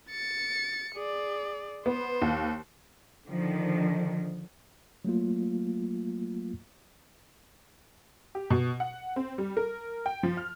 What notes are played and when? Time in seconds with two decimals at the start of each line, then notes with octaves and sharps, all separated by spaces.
0.10 A6 C#7
0.95 G#4 D5
1.86 B3 C5
2.22 D#2
3.28 D3 D#3 F3
5.05 F#3 A3 A#3 F4
8.35 G4
8.50 B2
8.80 F#5
9.16 C4
9.38 G3
9.57 A#4
10.06 G5
10.23 F3
10.37 F6